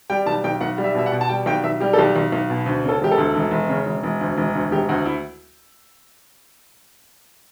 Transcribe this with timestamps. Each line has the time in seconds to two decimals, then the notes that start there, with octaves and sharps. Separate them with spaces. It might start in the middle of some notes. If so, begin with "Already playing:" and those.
0.10 G3 G5
0.26 B1 A5
0.44 B1 G5
0.61 B1 F#5
0.78 G3
0.84 E5
0.95 B2 E5
1.06 F#5
1.12 B2
1.21 A5
1.29 G3 G5
1.46 B1 G5
1.64 B1 E5
1.80 G3 G4
1.93 A4
1.98 B1 G4
2.16 B1
2.32 B1
2.50 B2
2.66 D2
2.84 C#3 A4
3.01 E1 G4
3.11 A4
3.18 D2
3.35 E1
3.51 E1
3.69 C#3
3.86 E1
4.03 E1
4.21 D2
4.37 E1
4.55 D2
4.71 E1 G4
4.89 D2 F#4
5.06 E4